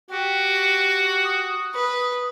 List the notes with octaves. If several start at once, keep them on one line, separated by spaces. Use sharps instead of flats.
F#4 G4
D#6
B4